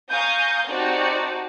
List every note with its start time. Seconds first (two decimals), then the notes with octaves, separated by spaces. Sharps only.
0.11 F5 G#5 A#5 C#6 D#6 G6
0.68 C4 D#4 F#4 G4 D5 A5